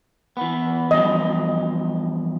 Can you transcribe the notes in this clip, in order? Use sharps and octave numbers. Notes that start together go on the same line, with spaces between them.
E3 B3
E2 G2 F3 D#5